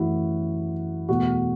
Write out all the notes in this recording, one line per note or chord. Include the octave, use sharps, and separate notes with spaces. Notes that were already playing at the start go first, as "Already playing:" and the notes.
Already playing: F#2 E3 A3 E4 F#4
E2 B2 A3 F#4